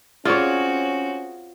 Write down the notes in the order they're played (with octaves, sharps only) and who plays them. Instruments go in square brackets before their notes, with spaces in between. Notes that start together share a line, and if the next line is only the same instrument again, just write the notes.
[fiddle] C4 F#4 [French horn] C#4 [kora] F4 C#5 [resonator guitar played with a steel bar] G#4 D5